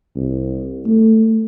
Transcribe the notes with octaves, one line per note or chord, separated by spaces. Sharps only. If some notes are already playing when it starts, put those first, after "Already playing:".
C2
A3